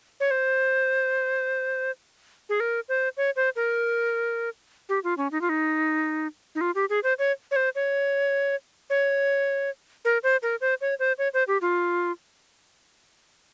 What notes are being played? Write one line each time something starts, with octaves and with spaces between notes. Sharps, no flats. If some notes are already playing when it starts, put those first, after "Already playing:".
C#5
C5
G#4
A#4
C5
C#5
C5
A#4
G4
F4
C#4
D#4
F4
D#4
D#4
F4
G4
G#4
C5
C#5
C#5
C5
C#5
C#5
A#4
C5
A#4
C5
C#5
C5
C#5
C5
G4
F4